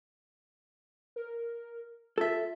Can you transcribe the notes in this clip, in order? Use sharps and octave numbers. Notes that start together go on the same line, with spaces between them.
A#4
F4 A4 E5